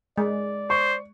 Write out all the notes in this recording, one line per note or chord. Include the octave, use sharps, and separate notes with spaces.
G#3 D5
C5 C#6